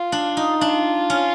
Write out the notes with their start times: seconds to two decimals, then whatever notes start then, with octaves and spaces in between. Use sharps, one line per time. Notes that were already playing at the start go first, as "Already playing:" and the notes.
Already playing: F4
0.12 D4
0.37 D#4
0.61 D4 F4
1.10 C#4